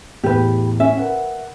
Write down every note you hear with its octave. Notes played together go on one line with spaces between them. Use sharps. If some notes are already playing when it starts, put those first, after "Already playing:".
E2 A2 G4 B4
C#4 E5
A#4 B4 F#5